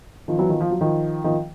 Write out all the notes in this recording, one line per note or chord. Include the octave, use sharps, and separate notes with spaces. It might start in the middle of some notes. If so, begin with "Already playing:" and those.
D#3 F3
E3 F#3
D#3 F3
F3
F#3
D#3 F3
D#3 F3